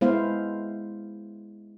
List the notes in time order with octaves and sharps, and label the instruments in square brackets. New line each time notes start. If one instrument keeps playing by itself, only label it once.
[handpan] G#3 B3 E4 C5 F5